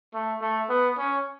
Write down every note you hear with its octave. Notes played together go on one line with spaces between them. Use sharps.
A3
A3
B3
C#4